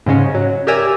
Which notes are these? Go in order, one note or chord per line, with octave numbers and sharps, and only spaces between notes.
G#2 C#3 G#3 C#4
F#3
G4 A#4 D5 E5 G#5 A#5